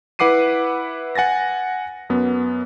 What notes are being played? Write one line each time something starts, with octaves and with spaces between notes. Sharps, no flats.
E4 B4 F#5 D6 C7 D#7
F#5 G#5 A6 A#6
F#2 B3